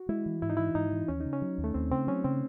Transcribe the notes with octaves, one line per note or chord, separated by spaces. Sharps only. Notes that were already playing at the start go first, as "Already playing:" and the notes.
Already playing: F#4
G#3 E4
E3
G#2 E4
D#4
E3 E4
G#2 D#4
E3
D#2 C#4
D#4
C#3
C#4
F#3
D#2
A3
D#2 C4
C#3 C4
F#3 C#4
C#3 C4